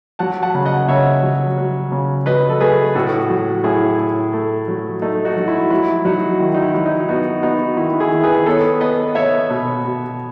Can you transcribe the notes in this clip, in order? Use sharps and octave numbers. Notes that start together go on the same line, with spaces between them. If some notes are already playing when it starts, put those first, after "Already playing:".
F#3 F#5 A5
F#5 A5
C#3
D#5 F#5
C#3 C#5 E5
F#3
F#3
C#3
F#3 B4 D#5
A4
A3 G#4 B4
A2 F#4 A4
F#3
A2 E4 G#4
A2
A3
F#3
A3 D#4
D#4 F#4
F#3
E4
F#3 E4
F#3 D#4 F#4
D#3 E4
D#4
E4
F#3
D#4
B3 D#4 F#4
B3 D#4 F#4
D#3 E4
E4 G#4
D#3
G#4 B4
B3 A4 C#5
B3 B4 D#5
B3 C#5 E5
B2
B2